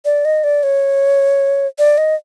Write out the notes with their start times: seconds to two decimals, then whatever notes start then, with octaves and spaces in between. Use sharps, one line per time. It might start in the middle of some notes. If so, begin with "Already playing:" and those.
0.05 D5
0.25 D#5
0.44 D5
0.63 C#5
1.79 D5
1.98 D#5